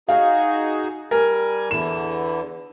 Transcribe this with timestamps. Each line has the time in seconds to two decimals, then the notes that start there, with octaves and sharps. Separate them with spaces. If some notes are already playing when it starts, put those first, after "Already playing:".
0.09 D#4 F#4 G#4 F5
1.11 G3 A#4 G#5
1.71 E2 D3 E3 E7